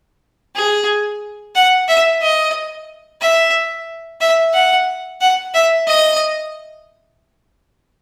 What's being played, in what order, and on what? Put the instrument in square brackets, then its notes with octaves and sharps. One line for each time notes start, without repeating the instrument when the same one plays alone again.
[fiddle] G#4
F#5
E5
D#5
E5
E5
F#5
F#5
E5
D#5